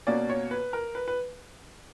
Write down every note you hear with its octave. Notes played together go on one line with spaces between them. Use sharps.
B2 A#3 C#4 D5
C#5
B4
A#4
B4
B4